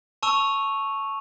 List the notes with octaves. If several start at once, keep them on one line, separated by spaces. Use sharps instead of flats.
A5 C#6 E6 D#7 F7